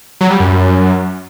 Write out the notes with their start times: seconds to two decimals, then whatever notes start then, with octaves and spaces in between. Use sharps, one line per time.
0.21 F#3
0.30 G3
0.40 F#2